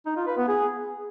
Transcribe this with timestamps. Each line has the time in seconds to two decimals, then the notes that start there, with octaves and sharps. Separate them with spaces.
0.06 D#4
0.16 F4
0.27 B4
0.38 B3
0.48 G#4